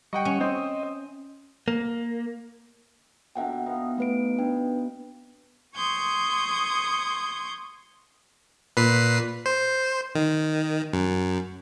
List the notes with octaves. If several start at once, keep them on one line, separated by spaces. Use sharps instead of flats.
G3 D#5 F#5 G5 C#6
C#4
C4 C5 D#5
A#3
B2 D3 E5 F#5 G5 A#5
B3 D#4 F5
A3 B4 D7
D4 B4 G5
C6 C#6 D#6 G6 G#6
A#2 B4 C7
C5
D#3
F#2